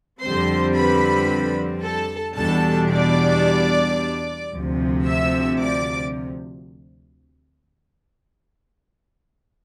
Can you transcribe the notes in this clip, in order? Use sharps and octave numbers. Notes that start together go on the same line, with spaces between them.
F2 D3 G3 C4 C5 C6
B4 B5
A4 A5
E2 B2 G3 D4 A4 A5
D5 D6
D2 C3 F3
E5 E6
D5 D6